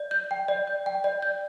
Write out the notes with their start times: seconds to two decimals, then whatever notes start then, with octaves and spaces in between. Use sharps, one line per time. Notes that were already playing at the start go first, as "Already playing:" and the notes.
Already playing: D5
0.11 G6
0.31 G5
0.48 D5
0.67 G6
0.86 G5
1.04 D5
1.22 G6